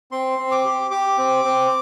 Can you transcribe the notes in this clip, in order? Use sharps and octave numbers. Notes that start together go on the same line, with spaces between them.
C4 C6
C4
D6
G4
G4 D6
C4
C4